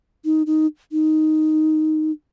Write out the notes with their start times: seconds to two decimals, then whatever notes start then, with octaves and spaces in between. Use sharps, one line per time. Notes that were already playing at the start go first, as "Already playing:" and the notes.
0.25 D#4
0.47 D#4
0.92 D#4